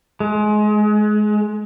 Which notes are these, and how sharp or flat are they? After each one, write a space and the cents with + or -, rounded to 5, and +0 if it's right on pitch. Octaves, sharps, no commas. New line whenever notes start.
G#3 +25